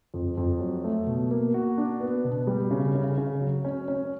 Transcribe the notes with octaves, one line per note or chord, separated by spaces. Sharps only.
F2
F2
F#3
A3
B2
A#3
F#4
D4
B3
B2
G3
C#3
C#3
C#3
F#3
C#4
C#4